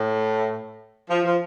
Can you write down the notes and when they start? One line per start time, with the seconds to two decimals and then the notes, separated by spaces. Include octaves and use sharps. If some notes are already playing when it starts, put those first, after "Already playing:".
Already playing: A2
1.10 F3
1.25 F3